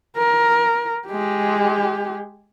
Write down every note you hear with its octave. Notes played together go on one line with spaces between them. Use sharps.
A#4
G#3 G4